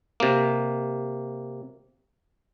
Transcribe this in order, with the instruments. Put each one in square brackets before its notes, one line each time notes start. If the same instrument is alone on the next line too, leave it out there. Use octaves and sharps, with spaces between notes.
[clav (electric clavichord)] C3 A#3